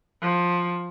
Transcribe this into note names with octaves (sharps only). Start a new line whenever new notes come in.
F3